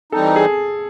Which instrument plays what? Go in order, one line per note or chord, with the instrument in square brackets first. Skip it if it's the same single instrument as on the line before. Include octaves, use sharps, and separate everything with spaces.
[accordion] E3 G3 C4 D#4 [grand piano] A4
[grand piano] G#4